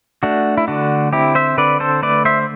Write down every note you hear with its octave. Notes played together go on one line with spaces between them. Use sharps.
A3 D4 F#4
E4
D3 D4 F#4
C4 E4 G4
C5 E5
D3 B4 D5
A4 C5
A3 B4 D5
C5 E5